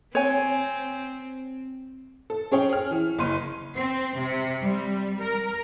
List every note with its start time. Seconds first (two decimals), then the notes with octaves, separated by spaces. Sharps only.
0.15 C4 C#5 G#5
2.30 A4
2.52 C#4 G#4 C#5 G5
2.69 G#4 F6
2.91 E3
3.19 F#1 C6 D#7
3.76 C4
4.18 C3
4.63 G3
5.21 A#4